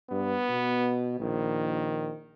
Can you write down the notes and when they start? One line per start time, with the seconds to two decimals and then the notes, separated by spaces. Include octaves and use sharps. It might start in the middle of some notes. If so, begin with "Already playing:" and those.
0.11 G2 B3
0.49 B2
1.20 A#1 D#3